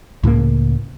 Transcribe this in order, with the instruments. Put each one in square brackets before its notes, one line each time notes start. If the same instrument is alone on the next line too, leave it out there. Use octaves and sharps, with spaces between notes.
[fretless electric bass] C#2 A2 C#3 A#3